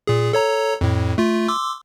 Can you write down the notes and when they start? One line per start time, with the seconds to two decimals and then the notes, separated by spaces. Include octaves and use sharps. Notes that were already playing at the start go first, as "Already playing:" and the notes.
0.07 A#2 G#4
0.33 A4 C#5 A#5
0.81 F2 A2
1.18 A3 F4
1.48 C6 D6 E6